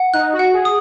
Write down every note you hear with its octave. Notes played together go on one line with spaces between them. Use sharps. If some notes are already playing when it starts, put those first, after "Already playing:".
Already playing: F#5
D#4 F#6
F#4
F#5
G#4
D#6